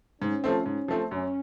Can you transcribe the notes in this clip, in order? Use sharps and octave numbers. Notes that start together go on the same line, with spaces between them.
G#2 C#4
F3 A3 C4
G#2
F3 A3 C4
F#2 C#4